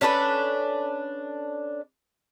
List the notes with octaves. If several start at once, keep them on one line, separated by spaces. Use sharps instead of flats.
C#4 D4 A4 B4